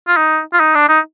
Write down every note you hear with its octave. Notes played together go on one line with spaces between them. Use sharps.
F4
D#4
F4
D#4
D4
D#4